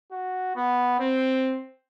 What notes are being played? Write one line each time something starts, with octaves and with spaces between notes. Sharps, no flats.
F#4
B3
C4